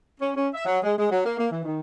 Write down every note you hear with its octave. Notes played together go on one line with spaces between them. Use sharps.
C#4
C#4
E5
F#3
G#3
G#3
F#3
A#3
A#3
E3
D#3